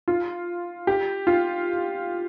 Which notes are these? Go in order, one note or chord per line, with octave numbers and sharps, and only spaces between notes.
F4
G4
F4